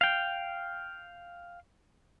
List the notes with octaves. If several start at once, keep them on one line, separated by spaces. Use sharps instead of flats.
F5 G5